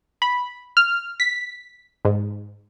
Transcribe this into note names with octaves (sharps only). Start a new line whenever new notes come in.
B5
F6
B6
G#2